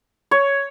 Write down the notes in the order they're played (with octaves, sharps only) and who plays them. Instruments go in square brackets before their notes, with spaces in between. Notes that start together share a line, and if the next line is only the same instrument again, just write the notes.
[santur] C#5